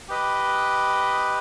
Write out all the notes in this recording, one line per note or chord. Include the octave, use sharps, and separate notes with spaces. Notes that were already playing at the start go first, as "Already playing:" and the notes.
G4 B4 D#5